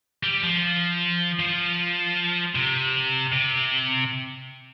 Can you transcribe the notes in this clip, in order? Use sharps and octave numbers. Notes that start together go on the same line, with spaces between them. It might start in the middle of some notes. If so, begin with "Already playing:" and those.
G3
F3
F3
C3
C3